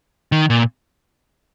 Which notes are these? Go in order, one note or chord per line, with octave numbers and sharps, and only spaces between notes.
D#3
A#2